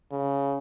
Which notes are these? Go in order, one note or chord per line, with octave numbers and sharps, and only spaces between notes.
C#3